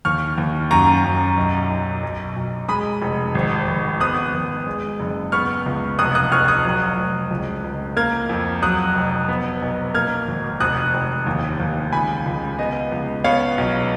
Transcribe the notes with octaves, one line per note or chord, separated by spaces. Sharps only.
D#2 C#6 F6
D#2
F#2 A#5 C#6
F#2
B1
B1
B1
B1
G#3 B5 D#6
F1
G#1
G#1
B3 D#6 F#6
G#1
G#3
F#1
B3 C#6 F6
C#2
F1 D#6 F#6
D#6 F#6
F1 C#6 F6
D#6 F#6
F#3
F1
C#2
C#2
A#3 F6 G#6
F2
F#3 D#6 F#6
F1
B3
B1
A#3 F6 G#6
G#1
F1 D#6 F#6
F1
D#2
D#2
C#2 G#5 B5
C#2
B3 D#5
C#2
B3 C#5 F5
B1